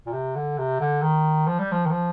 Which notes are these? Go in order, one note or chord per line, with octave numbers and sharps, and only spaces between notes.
A#2
C3
D3
C3
D3
D#3
F3
G3
F3
D#3
F3